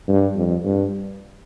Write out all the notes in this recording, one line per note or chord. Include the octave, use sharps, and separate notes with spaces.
G2
F2
G2